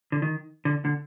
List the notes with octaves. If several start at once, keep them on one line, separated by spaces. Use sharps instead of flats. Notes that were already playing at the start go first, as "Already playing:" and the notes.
D3
D#3
D3
D3